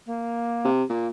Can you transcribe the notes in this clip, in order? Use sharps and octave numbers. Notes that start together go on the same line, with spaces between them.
A#3
C3
A#2 A#3